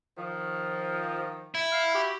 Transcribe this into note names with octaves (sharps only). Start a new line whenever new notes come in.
D#3 F3
E4
F5
F#4 G4